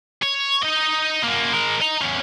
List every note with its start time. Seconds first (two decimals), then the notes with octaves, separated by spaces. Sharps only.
0.22 C#5
0.63 D#4 D#5
1.23 F#2 A#3
1.53 G#3 A#4
1.81 D#5 A#5
2.01 E2 C#4